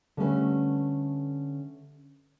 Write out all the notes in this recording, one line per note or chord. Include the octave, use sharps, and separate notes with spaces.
D3 G3 A3 A#3 C#4 B4